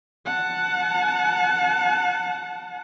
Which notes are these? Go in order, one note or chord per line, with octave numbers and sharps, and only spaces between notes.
F#5 A5